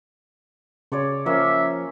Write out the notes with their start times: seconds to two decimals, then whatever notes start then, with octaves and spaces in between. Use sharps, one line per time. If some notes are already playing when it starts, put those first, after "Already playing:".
0.92 C#3 C#5 D5 C#6
1.26 F3 A#3 C#4 E5